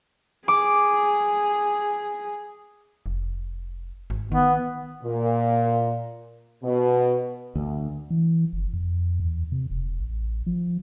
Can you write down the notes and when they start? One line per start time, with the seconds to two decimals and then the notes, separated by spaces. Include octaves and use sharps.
0.48 G#4 D6
3.06 F1
4.10 G#1
4.32 D#3 B3
5.03 A#2
6.63 B2
7.55 D2
8.10 E3
8.53 F#1
8.73 F2
9.20 E2
9.52 C3
9.70 E1
10.00 A1
10.47 F3